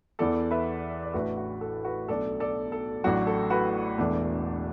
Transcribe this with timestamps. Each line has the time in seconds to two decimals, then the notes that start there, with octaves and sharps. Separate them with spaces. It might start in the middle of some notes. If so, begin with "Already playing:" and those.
0.19 E2 E3 B3 A4 D5
0.51 B4 E5
1.03 D5
1.14 A1 A2 A3 D4 F#4 B4
1.37 F#4
1.61 A4
1.85 F#4 B4
2.08 B1 B2 A3 D4 A4 D5
2.40 A4 D5
2.72 A4
3.04 A1 A2 F#3 D4 F#4
3.27 A4
3.50 F#4 B4
3.98 E1 E2 E3 A3 D4